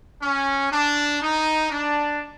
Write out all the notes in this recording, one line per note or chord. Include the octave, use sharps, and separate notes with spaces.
C#4
D4
D#4
D4